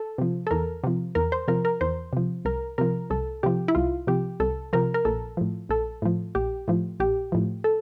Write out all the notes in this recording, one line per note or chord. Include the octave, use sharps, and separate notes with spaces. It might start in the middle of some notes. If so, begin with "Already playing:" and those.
Already playing: A4
C3 F3
A4
E2 A#4
C3 F3
E2 A#4
C5
C3 F3 A#4
A#4
E2 C5
C3 F3
C2 A#4
C3 F3 A#4
C2 A4
C3 F3 G4
E4
C2 F4
C3 F3 G4
C2 A4
C3 F3 A#4
A#4
A#1 A4
A2 F3
A#1 A4
A2 F3
A#1 G4
A2 F3
A#1 G4
A2 F3
A4